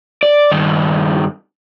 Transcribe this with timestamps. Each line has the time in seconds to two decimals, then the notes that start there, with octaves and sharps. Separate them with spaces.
0.23 D5
0.52 G2 D#3